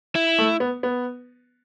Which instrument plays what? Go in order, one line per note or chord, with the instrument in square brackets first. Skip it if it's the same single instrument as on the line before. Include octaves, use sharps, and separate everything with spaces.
[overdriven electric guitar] E4
[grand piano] A3
B3
B3